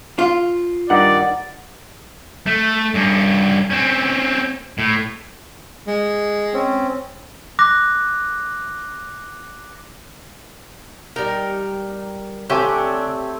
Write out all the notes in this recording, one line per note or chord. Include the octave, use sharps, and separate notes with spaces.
F4
G2 D#3 D#4 D5 F#5
A3
G2 C#4
C4 C#4
A2
G#3
C4 C#4
D6 F#6 A#6
G3 D#4 A#4
D3 A3 C4 D4 G4 C#5 G#5